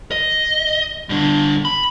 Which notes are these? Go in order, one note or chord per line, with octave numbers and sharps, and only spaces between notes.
D#5
G2 D3
B5